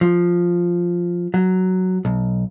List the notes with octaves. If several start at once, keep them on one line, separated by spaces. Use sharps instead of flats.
F3
F#3
B1